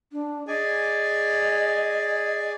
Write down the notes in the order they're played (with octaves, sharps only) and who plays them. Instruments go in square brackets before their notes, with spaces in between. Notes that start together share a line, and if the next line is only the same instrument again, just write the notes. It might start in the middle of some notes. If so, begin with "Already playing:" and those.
[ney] D4
[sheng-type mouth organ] G#4 D5 G#5 [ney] D#5